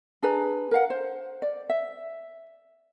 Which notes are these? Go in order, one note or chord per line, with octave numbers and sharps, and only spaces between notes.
D4 G#4 B4 A#5
A#4 B4 F5 F#5
C5
D5
E5